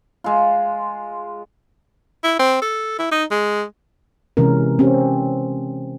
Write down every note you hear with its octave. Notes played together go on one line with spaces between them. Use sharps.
G#3 F4
E4
C4
A4
E4
D#4
G#3
C3 E3 G#3 C#4 A#4
C4 C#4 G4